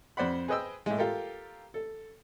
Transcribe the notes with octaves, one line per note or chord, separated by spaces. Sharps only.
F2 C5 D5 F#5 B5
G#4 B4 C5 D#5 G5 E6
A2 G#3
F4 G4 A4 A#4
A4